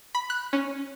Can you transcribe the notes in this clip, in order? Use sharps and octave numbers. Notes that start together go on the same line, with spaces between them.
B5
F#6
C#4